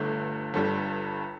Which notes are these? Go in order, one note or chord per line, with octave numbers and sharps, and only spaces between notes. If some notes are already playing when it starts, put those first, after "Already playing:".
Already playing: G1 G2 D3 A3
G1 G2 G3 A4